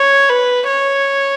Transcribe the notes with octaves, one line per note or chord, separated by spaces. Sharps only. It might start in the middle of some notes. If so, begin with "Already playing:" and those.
Already playing: C#5
B4
C#5